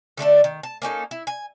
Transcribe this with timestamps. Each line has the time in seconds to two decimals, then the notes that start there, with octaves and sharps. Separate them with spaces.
0.17 D3 A3 D4 A4
0.44 D#3
0.63 A5
0.82 A#3 C#4 D#4 A4
1.11 E4
1.27 G#5